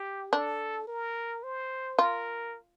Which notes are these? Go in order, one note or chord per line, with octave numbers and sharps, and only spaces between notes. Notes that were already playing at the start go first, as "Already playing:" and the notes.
Already playing: G4
D4 A4
A#4
C5
F4 A#4